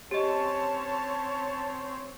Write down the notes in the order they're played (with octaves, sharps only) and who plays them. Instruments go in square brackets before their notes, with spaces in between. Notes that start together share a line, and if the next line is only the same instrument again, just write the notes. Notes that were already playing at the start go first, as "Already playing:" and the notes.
[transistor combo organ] C4 [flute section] C#4 C#5 C#6 [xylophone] G4 D#5 [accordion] A5